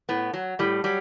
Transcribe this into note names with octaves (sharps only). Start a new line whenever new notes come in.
A2 B3
F#3
A2 G3
F#3 G3